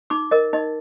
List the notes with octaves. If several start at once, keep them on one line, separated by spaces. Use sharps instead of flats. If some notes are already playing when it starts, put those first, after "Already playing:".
D#4 D6
A#4 D#5
D#4 D#5